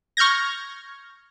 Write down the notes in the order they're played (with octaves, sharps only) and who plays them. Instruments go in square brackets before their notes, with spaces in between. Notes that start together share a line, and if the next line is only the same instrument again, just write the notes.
[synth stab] C#6 F6 G6 G#6 A#6